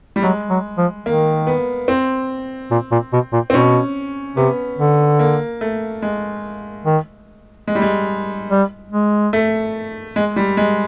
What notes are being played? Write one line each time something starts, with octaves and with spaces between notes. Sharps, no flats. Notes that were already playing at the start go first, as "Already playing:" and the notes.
G3
F#3 G#3
F#3
F3
D#3 A#3
B3
C4
A#2
A#2
B2
A#2
C4
B2 C#4
C3 B3
D3
A#3
A3
G#3
D#3
G#3
G3
G#3
G3
G#3
A3
G#3
G3
G#3